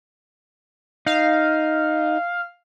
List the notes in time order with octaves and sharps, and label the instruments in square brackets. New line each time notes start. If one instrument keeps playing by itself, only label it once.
[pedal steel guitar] D#4 [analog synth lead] F5